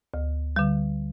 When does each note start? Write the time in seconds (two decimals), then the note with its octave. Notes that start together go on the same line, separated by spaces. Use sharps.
0.14 D2
0.56 D3 G3